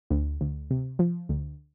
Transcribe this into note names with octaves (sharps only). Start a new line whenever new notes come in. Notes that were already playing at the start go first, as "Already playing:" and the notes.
D2
D2
C3
F3
D2